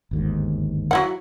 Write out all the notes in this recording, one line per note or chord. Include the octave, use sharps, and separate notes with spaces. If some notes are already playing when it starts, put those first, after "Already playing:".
G1 D#2 G#2
F#3 E4 F#5